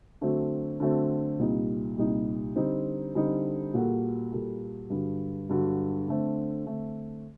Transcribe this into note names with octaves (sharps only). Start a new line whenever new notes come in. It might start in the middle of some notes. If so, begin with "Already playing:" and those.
D3 F#3 A3 C4
D3 F#3 A3 C4
C2 A#2 G3 A#3 D#4
C2 A#2 G3 A#3 D#4
D3 G3 C4 D#4
D3 G3 C4 D#4
A#2 G3 A#3 F#4 A4
A#2 G3 A#3 F#4 A4
G2 D3 F#3
G2 D3 F#3
D3 A3 C4
D3 A3 C4